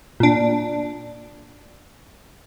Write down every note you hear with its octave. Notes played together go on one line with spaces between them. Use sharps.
A#2 D4